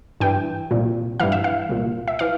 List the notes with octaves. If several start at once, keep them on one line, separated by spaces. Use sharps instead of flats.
G2 E3 G5
C2 A#2
G2 E3 F5
E5
F5
C2 A#2
E5
E3 F5